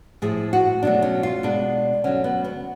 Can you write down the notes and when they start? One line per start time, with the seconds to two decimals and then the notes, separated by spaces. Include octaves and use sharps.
0.22 A2 F3 A3 G#4
0.53 F#4
0.83 B2 F#3 A3 D4
1.02 C#4
1.23 F4
1.43 B2 G#3 D4
2.04 D2 D3 F#3 A3 C#4
2.24 B3
2.45 B3